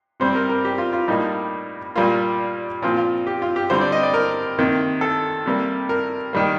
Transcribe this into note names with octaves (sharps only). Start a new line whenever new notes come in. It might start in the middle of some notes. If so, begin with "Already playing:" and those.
C3 G3 C4 C5
A#4
A#4
G4
F4
F4
A2 G3 A#3 D#4
A#2 G3 A#3 F4
A#2 F3 C4 F4
F4
G4
F4
G4
D3 G3 C4 C5
D5
D#5
D5
A#4
C3 D#3 A#3
A4
C3 G3 A#3
A#4
D#3 G3 A#3